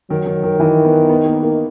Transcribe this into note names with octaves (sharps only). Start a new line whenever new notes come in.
D#3 F#3
D#3
D#3
D#3 E3
B3
B3
A#3
A#3